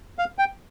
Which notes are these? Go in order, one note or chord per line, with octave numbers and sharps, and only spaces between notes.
F5
G5